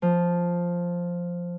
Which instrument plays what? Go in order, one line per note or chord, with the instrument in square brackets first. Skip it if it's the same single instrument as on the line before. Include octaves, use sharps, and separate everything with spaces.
[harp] F3